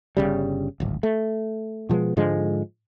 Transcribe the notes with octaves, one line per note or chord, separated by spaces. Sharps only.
G1 C#2 C#3 G3
D1 G#1
A3
B2 F3 G#3 B3
G#2 D3 F3 G#3